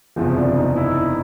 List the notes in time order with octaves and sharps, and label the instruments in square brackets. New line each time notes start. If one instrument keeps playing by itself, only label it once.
[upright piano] F#1 E2 C3 F3
[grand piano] D4
D#4
E4